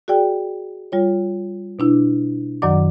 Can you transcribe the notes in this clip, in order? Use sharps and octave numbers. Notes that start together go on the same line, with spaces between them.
F#4 G#4 D5 G5
G3 F4 C#5
B2 D4 E4
F#2 D#3 F#3 D5 F#5 D6